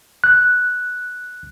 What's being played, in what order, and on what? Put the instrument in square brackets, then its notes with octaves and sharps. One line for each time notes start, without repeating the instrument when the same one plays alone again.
[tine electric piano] F#6